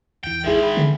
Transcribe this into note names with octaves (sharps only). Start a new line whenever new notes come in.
E2 E3 G5
A1 D#3 G#3 E4 G#4 E5
G5 B5
D3